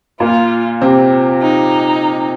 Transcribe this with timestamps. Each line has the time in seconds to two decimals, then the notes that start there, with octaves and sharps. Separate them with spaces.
0.20 A#2 A#3 F4
0.81 C3 C4
1.42 D#4